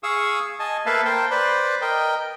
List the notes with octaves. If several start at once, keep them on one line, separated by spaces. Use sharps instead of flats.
G#4 F5 C#6 D#6 E6
D#5 G#5 A5
A#3 A4 B4 E5 F5 A5
A#4 C5 G5 A5
B4 C5 D5 B5
A#4 D#5 G5